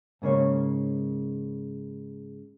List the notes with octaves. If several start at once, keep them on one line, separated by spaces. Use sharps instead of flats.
G#2 C#3 A#3 C#5